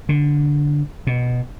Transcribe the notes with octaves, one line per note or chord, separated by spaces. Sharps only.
D3
B2